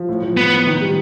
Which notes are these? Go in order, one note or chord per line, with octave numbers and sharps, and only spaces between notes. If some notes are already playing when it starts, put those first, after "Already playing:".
Already playing: F3
A2
F3
A2 B3
A2
D#3
G3